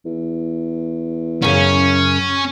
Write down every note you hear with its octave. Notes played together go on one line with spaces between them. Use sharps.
E2
F#2 C#3 C#4